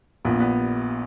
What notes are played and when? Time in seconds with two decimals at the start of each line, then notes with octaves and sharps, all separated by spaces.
0.25 A#1 A#2 B3
0.40 B3